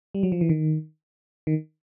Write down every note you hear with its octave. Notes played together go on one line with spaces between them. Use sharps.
G3
F#3
F3
E3
D#3
D#3